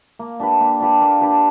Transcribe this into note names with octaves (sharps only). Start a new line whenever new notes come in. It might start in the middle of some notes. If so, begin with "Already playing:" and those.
A#3
D4 G4 B4
A#3
D4 G4 B4
A#3
D4 G4 B4